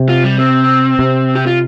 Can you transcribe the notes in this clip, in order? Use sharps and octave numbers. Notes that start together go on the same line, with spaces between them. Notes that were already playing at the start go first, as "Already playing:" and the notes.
Already playing: C3
F4
G3
C4
C3
G4
F4